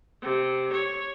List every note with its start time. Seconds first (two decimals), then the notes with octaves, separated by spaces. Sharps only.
0.21 C3
0.71 C#5